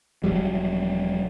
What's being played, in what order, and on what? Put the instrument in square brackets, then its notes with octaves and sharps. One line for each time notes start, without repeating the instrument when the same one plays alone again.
[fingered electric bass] E1 C2 F#3 G3